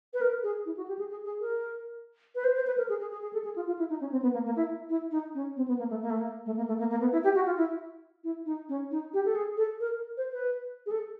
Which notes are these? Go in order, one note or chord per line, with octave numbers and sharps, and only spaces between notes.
B4
A#4
G#4
E4
F#4
G4
G#4
G#4
G#4
A#4
B4
C5
C5
B4
A#4
G#4
G#4
G#4
G#4
A4
G#4
F4
F4
E4
D#4
C#4
C4
B3
A#3
A#3
E4
E4
D#4
C#4
C4
B3
A#3
A3
A#3
A3
A#3
A3
A#3
A3
A#3
A#3
B3
E4
G4
F#4
F4
E4
E4
D#4
C#4
D#4
G4
A4
G#4
A4
A#4
C5
B4
G#4
A4